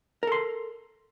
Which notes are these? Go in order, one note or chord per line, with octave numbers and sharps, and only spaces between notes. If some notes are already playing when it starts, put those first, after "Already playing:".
A4 A#4 C6